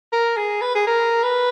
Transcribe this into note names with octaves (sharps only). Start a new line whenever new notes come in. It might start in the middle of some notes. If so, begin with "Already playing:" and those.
A#4
G#4
B4
G#4
A#4
B4